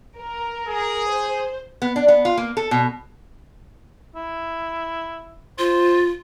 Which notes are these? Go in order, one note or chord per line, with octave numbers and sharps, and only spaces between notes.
A#4
G#4
C5
B3
D4
B3
F4
A#3
A4
B2
E4
F4 C5